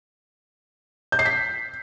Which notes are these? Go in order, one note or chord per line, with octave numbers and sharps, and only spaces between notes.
G6
C7
B6